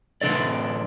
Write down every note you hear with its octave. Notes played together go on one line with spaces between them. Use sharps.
A2 E3 D4 A4 D5